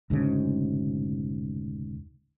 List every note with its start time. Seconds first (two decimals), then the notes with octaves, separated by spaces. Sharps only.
0.10 F1 D2 G#2 C#3